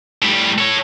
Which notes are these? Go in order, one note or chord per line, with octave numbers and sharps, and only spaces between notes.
A2 G3
A4 C#5